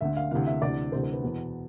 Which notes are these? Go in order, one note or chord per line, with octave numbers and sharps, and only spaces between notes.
D2 D3 E5
F5
D2 C3 E3 F5
E5
D2 C3 E3 D5
D2 C3 E3 C5
C5
B4
E2 B2